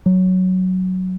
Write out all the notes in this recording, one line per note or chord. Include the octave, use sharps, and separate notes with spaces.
F#3